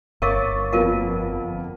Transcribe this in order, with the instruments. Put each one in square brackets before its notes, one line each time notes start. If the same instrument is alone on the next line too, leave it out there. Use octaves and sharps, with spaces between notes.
[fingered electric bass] G1 [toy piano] A#4 C#5 F5 [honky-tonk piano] C#6 D6 A6
[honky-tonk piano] F2 A#3 B3 [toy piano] F4 A#4 F5